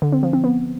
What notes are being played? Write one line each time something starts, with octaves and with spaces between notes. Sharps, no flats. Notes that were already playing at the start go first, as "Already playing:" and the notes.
D3
C4
F3
C4
B3